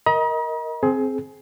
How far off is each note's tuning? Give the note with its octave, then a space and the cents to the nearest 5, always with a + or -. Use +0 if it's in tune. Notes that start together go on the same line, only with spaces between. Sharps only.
A#4 +0 D#5 +20 A#5 +45
C4 +0 G#4 +25